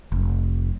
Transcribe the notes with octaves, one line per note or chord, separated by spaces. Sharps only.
F1